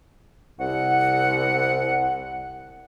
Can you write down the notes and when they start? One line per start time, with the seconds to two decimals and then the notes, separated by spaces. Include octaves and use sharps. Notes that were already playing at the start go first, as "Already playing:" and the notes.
0.59 C2 F#5